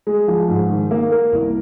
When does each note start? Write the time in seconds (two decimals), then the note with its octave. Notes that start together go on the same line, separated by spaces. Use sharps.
0.07 G#3
0.28 F3
0.48 G#2
0.70 D#3
0.91 A#3
1.12 A#4
1.32 C2